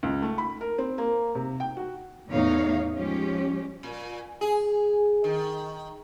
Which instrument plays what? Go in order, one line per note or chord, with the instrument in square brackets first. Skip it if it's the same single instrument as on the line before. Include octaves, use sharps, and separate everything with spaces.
[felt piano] C#2
A3
B5
A#4
C4
A#3
C3
G5
F#4
[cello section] E2 A2 D#4 C#5 F5
F3 G#3 C#4 G4
[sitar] A#2
G#4
D#3